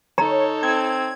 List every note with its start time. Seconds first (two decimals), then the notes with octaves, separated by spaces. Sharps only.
0.18 D#4 A4 C#5 A#5
0.63 C4 G#6